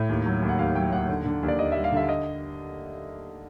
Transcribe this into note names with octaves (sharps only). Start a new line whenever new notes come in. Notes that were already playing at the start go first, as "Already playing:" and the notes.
Already playing: A2
D#2
F#3
D#2
F#5
D#2 F5
F#3 G5
D#2 F#5
D3
D3
D#2
D5
D#2 D#5
E5
G3
F5
D3 E5
D#5